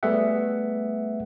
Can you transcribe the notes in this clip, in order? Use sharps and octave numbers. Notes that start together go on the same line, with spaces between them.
G3 A3 B3 G#4 E5 F#5